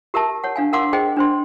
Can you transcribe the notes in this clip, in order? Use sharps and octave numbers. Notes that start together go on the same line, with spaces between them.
G4 A#4 E5 A5
C#5 F#5
D4 F5 G#5
A#4 F5 F#5 C6 D6 E6
G#4 C5 D#5 G5
D4 C5 C6